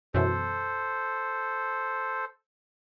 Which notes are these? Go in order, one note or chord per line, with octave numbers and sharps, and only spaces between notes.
F#2 B2 E3 A4 C5